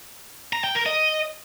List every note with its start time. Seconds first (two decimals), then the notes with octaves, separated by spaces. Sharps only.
0.53 A#5
0.64 G5
0.75 A#4
0.86 D#5